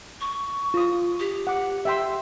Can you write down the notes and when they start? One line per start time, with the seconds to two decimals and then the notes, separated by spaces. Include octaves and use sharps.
0.21 C#6
0.74 F4 D#6
1.20 G4
1.47 F#5 D6
1.85 E5 G5 C6